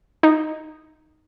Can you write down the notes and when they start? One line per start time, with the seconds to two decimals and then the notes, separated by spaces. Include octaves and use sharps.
0.23 D#4